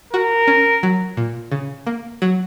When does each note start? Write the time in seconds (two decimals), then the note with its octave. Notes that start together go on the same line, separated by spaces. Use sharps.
0.13 F#4 A#4
0.47 C#4
0.83 F#3
1.17 A#2
1.51 C#3
1.87 A#3
2.22 F#3